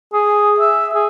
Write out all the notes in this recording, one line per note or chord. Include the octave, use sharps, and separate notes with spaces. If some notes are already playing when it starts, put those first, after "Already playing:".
G#4
E5
G#4